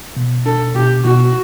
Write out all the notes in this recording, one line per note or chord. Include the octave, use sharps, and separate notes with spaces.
B2
D4 A4
B2 G4
B2 F#4